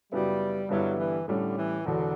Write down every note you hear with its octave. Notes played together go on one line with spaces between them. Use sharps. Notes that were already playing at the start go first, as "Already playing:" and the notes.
F#2 C#3 F#3 G3 B3 E4
G2 D3 F#3 G3 B3 E4
E3
A2 D3 G3 C#4
E3
E1 E2 B2 D3